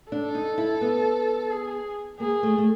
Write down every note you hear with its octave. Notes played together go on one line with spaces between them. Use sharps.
D4 A4
D#4
E4
B3
G#4
A#3 G#4
A3
A3